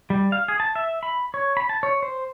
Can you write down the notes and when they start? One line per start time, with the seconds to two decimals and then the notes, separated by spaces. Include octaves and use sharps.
0.10 G3
0.32 F5
0.48 G#4
0.60 A5
0.75 E5
1.03 B5
1.34 C#5
1.57 B5
1.69 A5
1.83 C#5
2.03 C5